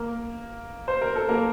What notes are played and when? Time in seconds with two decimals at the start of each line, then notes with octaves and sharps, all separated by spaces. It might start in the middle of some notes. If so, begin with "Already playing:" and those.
Already playing: A#3 A#4
0.88 C5
1.01 A#4
1.16 A4
1.29 A#3 A#4